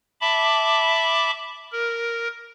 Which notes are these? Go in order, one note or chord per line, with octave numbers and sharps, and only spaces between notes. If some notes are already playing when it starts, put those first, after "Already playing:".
E5 A5 B5 D6
A#4